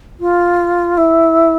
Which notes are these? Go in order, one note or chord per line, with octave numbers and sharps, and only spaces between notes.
F4
E4